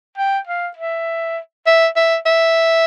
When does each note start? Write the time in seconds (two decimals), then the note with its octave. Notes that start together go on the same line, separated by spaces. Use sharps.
0.18 G5
0.47 F5
0.77 E5
1.66 E5
1.96 E5
2.26 E5